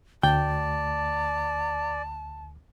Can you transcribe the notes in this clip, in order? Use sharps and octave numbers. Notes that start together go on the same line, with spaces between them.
D2 D5 G5 A5